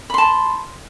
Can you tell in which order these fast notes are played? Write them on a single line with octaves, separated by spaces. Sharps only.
B5 C6 A5